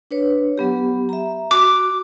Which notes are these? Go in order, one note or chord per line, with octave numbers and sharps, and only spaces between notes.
D4 B4 C#5
F#3 B3 G4
E5 A#5
F#4 D6